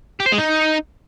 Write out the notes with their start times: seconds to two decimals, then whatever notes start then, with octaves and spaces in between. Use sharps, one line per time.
0.20 G4
0.26 C5
0.32 G#3
0.38 D#4